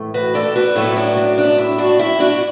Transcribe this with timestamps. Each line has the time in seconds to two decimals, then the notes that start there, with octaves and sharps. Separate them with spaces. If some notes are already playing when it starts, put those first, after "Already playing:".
Already playing: A2 E3 A3
0.14 F#4 B4
0.34 A4 D5
0.56 F#4 B4
0.76 A2 F#3 B3 E4 A4
0.96 D4 F#4
1.17 D4
1.38 D4
1.58 E4
1.78 D4 F#4
1.99 E4
2.20 D4 F#4